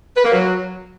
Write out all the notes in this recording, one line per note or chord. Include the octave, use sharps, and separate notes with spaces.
B4
A#3
F#3